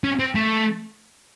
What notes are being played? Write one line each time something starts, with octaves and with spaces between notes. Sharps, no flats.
C#4
C4
A3